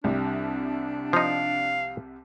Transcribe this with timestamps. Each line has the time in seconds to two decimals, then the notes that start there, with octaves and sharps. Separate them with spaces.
0.04 C2 C3 G3 D4
1.13 F3 D#4 F5